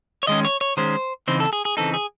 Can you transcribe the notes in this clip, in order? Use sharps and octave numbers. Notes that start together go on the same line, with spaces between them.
C#5
D#3 G#3 C#4 D#5
C#5
C#5
D#3 G#3 C#4 C5
C#3 E3 C4 D#4 C5
A4
G#4
G#4
C#3 E3 C4 D#4 A4
G#4